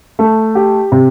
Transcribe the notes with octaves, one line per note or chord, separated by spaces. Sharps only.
A3
G4
C3